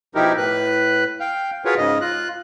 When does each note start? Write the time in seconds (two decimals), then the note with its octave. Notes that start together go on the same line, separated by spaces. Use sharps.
0.15 B2 F3 D#4 E4 G4 A#4
0.37 A2 B4 F#6
1.20 F5 G5
1.65 F4 F#4 G#4 A#4 B4 C#5
1.77 G#2 C#3 D#5
2.01 F4 F#6